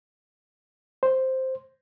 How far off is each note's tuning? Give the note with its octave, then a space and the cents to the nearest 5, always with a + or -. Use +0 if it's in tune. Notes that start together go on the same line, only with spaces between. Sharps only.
C5 +0